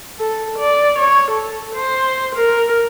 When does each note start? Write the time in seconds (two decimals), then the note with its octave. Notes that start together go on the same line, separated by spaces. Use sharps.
0.19 A4
0.59 D5
0.99 C#5
1.31 A4
1.75 C5
2.36 A#4